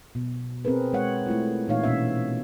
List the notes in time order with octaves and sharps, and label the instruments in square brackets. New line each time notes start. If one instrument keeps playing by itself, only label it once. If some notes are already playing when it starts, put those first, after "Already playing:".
[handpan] B2
C4 G#4 A#4 B4
G#3 C#5 F#5
A3 E4 F4
A#2 E3 D#4 C#5 F5
B2 B3 C#4 E5